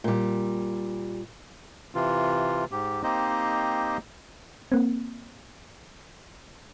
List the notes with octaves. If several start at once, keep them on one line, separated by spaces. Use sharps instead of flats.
A#2 G3
C3 E3 F4
G#2 G4
A#3 C4 D#4 G4 C5 D#5
A#3 C4